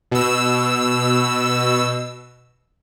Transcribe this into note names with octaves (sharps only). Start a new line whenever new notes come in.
B2 E6